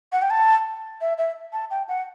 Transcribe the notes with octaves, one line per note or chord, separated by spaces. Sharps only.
F#5
G5
A5
E5
E5
A5
G5
F#5